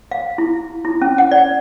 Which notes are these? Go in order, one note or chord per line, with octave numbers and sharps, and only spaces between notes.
F5
E4
E4
C#4
F#5
D5